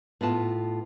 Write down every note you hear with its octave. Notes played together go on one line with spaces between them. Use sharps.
A2 B3 F4 A5